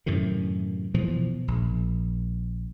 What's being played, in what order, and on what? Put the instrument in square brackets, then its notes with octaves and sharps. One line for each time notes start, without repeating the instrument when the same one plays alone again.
[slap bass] F#2 A2 C3 D#3
B2 E3 F3
A#1